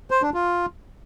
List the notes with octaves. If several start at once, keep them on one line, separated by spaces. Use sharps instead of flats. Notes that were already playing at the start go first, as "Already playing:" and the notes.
C5
D4
F4